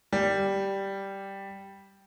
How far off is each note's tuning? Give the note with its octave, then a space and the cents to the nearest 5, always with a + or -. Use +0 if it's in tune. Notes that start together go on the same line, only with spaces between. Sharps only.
G3 -5